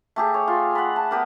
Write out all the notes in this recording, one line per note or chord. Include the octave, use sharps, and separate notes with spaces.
A3 G4 G#4
C#5
F4
F#5 B5
A5
B3 G4 A#4